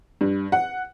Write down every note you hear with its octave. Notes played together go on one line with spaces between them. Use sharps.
G2
F#5